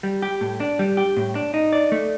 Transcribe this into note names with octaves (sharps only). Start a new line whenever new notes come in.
G3
G4
A2
D4
G3
G4
A2
D4
D#4
D5
A3